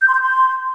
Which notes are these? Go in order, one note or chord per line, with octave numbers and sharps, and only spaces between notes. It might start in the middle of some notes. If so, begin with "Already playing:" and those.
G6
C6
G6
C6